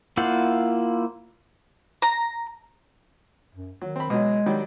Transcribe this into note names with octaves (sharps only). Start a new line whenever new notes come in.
A#3 E4 F4 C5 F#5
A#5
F#2
D#3 F#3
C4 B5
B2 F#3 G#3
D#3 F#3 G3